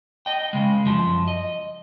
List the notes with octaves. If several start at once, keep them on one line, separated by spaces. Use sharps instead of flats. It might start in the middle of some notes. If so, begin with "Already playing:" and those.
D#5 G5
C#3 G#3
F#2 F3
D#5